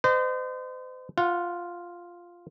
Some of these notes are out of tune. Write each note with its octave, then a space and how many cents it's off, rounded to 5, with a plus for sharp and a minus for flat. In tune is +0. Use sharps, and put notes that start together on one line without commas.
C5 -40 D#5 -35
F4 +0 F#5 -20